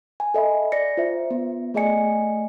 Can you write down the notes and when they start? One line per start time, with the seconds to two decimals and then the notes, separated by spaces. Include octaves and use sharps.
0.20 G#5
0.34 A4 D#5 E5 B5
0.72 D5 A#6 C#7
0.97 F4 C5 E5
1.31 B3
1.74 A3 G#4 D5 D#5 G#5 C#7